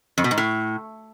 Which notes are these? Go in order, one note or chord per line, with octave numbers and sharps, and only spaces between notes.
F2
B2
G#2
A2